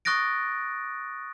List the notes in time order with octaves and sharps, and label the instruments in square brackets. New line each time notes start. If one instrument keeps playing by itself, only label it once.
[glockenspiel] C#6 D#6 F#6 A6 A#6 D7